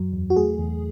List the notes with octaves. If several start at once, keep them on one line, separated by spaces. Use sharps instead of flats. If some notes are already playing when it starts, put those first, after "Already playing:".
Already playing: F#2 F#3
E2
F#4
A3 G#4
E2